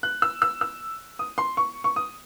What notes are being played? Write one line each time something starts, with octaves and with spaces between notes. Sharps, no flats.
F#6
E6
E6
E6
D#6
C6
C#6
C#6
D#6